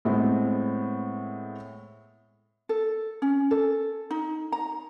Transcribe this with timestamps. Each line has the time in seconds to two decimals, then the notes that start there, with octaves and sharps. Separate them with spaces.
0.05 A2 G#3 B3 C4
2.69 A4
3.22 C#4
3.51 A4
4.11 D#4
4.52 A#5